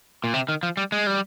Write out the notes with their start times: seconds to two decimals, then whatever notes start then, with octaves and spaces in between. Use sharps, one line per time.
0.24 A#2
0.34 C3
0.49 D#3
0.63 F3
0.77 G3
0.92 G#3
1.07 G3